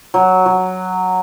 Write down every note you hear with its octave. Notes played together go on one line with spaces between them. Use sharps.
F#3
F#3